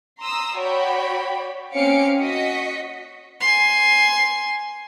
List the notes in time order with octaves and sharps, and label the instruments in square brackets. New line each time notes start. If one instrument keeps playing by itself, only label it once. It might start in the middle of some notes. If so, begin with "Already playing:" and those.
[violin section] A#5 C6 D#6 E6
F#4 C#5 D5 G5 B5
A#3 C4 C#4 F5 C#7 D7
F#4 D#5 B6 C#7
[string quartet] G#5 C6